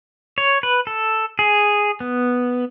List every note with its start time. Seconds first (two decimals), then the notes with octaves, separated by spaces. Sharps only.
0.38 C#5
0.63 B4
0.87 A4
1.39 G#4
2.00 B3